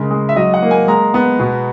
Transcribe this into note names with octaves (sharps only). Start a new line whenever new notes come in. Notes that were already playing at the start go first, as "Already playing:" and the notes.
Already playing: C#3 G#3 A#4
G#3
E5
F#3 D#5
F#5
A#3
G#5
G#3 A#5
B3
B2